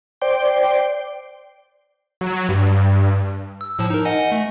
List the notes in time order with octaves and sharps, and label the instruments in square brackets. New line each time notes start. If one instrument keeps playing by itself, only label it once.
[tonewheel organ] C5 D5 G5
[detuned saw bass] F#3
G2
[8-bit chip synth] E6
A2 F3 A5
D#4 A#4
D#5 F#5 G#5
A3